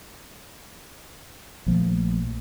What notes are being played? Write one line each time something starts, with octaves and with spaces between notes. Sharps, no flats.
A#1 F3 A3 A#3